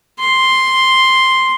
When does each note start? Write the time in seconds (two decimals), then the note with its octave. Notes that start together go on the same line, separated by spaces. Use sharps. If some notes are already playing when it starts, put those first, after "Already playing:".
0.19 C6